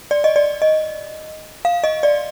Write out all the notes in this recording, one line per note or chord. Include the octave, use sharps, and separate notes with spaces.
D5
D#5
D5
D#5
F5
D#5
D5